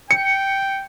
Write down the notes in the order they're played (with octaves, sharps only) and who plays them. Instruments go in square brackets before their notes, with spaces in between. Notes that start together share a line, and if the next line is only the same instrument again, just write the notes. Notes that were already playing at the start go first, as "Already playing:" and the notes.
[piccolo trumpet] G5 [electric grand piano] C#7